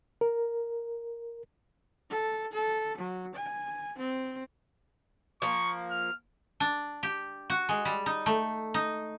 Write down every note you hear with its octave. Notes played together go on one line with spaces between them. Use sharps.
A#4
A4
A4
F#3
G#5
C4
F3 A#3 C#6
F6
D4
G4
F#4
G#3
G3
D#4
A3
D#4